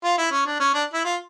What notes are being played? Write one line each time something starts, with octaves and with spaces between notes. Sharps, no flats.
F4
E4
C#4
D4
C#4
D4
E4
F4